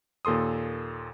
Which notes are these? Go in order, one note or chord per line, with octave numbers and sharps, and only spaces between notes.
D#2 A#2 A4 C6 D#6